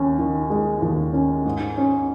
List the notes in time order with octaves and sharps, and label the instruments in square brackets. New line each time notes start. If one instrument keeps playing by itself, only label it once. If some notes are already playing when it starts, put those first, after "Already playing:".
Already playing: [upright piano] D#2 C#4
D#3
G#3
D#2
C#4
G#2
C#4